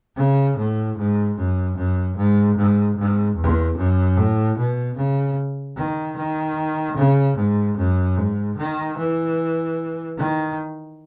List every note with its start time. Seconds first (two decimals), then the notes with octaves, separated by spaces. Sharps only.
0.16 C#3
0.57 A2
0.97 G#2
1.37 F#2
1.77 F#2
2.17 G#2
2.57 G#2
2.97 G#2
3.37 E2
3.77 F#2
4.17 A2
4.57 B2
4.97 C#3
5.77 D#3
6.17 D#3
6.97 C#3
7.37 G#2
7.78 F#2
8.17 G#2
8.57 D#3
8.98 E3
10.18 D#3